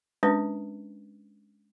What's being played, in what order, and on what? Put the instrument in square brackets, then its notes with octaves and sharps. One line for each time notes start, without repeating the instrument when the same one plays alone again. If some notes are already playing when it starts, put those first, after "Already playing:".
[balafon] G#3 C#4 D4 A#4 B4